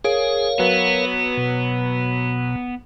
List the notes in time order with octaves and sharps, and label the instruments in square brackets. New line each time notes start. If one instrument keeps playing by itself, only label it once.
[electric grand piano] G#4 D7 [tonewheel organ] A#4 C#5 F5
[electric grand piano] F#3 B4 [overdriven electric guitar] B3
[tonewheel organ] B2